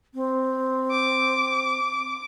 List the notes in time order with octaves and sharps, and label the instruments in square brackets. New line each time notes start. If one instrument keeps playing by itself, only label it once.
[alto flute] C4
[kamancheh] D6